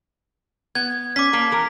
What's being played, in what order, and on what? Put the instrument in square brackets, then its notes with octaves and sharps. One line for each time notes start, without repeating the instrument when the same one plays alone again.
[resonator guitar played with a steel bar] B3 [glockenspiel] G#6
[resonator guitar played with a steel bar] C#4 [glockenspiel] D6 B6
[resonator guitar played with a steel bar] A#3 A5
E3 A#4